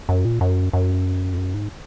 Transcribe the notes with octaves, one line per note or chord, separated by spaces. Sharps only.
F#2
A#2
F#2
F#2
F2
F#2
G#2